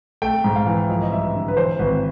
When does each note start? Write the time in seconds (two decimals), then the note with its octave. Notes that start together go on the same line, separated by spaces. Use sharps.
0.22 A3 G5
0.44 G#2
0.56 F5
0.66 E3
0.89 F3 D#5
1.02 D#5
1.12 G2 E5
1.35 D3
1.48 B4
1.57 E3 C5
1.79 G#1 B4